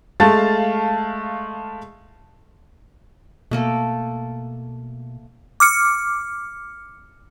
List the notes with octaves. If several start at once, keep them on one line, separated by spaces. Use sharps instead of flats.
G#3 A3 F5 A5 A6
B2 A3 A#3 A4
D6 F6 C#7